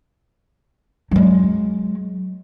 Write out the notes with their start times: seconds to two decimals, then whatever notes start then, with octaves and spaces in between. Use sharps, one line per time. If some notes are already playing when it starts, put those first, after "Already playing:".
1.11 F#3 G#3